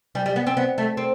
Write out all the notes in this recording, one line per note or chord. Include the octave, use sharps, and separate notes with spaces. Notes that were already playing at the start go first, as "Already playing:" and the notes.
G3
G3
B3
C4
B3
A3
C4